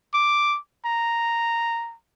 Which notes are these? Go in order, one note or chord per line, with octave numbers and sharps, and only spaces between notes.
D6
A#5